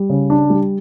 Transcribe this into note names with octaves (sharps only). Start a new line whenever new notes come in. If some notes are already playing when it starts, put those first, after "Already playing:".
Already playing: G3
C#3
D4
G3